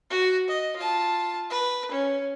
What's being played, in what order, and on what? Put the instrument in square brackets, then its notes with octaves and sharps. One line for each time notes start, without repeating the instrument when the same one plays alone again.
[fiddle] F#4
D#5
F4 A5
B4
C#4